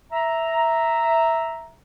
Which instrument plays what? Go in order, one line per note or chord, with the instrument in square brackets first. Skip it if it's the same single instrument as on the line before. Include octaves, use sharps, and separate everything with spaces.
[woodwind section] E5 A#5